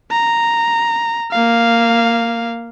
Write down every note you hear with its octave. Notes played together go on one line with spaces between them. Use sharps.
A#5
A#3 F5